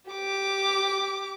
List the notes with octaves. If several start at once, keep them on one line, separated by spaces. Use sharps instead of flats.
G4 D6